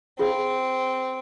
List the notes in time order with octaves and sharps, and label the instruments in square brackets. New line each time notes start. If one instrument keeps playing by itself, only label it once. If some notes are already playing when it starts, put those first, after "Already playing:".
[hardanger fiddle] C4 [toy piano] F4 G#4 F5